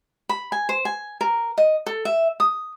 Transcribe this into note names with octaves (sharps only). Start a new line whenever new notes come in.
B5
G#5
C5
G#5
A#4
D#5
A4
E5
D#6